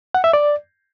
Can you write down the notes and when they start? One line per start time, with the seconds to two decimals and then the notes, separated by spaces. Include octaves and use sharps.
0.15 F#5
0.24 E5
0.33 D5